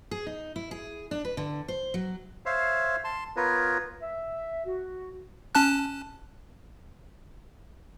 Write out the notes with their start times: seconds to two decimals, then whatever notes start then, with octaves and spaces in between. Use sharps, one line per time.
0.11 G#4
0.27 D#4
0.56 E4
0.71 G#4
1.11 D4
1.25 B4
1.37 D3
1.68 C5
1.94 F#3
2.46 C5 C#5 E5 F5
3.04 A5 C6
3.36 B3 F4 A#4 B4 C#5
4.02 E5
4.66 F#4
5.55 C#4 A5 F#6